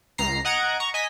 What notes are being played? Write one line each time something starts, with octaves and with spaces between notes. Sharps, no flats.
C#2 A#5 C7
D#5 F#5 A#5 G#6 D7
A#5 C#6
D#5 G#5 B6